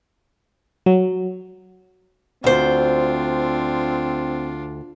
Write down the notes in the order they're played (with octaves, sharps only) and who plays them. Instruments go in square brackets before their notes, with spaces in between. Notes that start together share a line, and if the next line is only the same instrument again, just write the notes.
[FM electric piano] F#3
[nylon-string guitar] D2 C5 [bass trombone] C4 [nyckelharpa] D4 F4